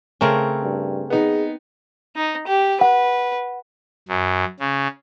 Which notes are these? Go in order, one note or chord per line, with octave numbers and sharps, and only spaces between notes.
C#3 A3 C4 C#4 A#4 C#5
G2
B3 D#4 G#4
D#4
G4
B4 F#5
F#2
C#3